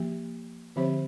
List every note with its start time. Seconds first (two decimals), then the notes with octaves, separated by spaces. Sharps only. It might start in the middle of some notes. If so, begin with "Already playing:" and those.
Already playing: F3 A#3 G4
0.76 D3 F3 C4 G4 C5